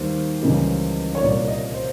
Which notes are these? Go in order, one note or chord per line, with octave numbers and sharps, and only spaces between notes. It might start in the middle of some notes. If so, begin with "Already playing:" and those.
Already playing: D#2 D#3 G3 A#3 C5
C#2 C#3 E3 G3 A#3
C#5
C2 A#2 G3 A#3 D5
D#5
C5